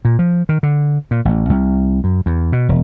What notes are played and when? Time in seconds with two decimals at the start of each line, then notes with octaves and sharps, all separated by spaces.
0.05 A#2
0.19 F3
0.49 D#3
0.63 D3
1.11 A#2
1.25 A1
1.49 C2
2.04 F#2
2.26 E2
2.52 B2
2.69 E1